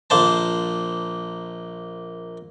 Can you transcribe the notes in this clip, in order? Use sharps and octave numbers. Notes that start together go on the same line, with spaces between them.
A#1 A#3 C5 A5